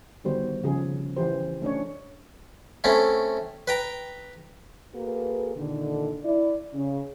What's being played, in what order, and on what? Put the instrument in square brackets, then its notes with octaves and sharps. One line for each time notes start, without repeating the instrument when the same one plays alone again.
[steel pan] D3 D#3 G3 B3 F#4 C5
C#3 F3 G#4
E3 C#4 G4 C5
A3 C#4 D4 C#5
[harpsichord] A3 C4 C#4 E4
B4 G5 A#5
[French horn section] A#3 F#4 G#4 A4 B4
A#2 D3 D#3
E4 D5
C#3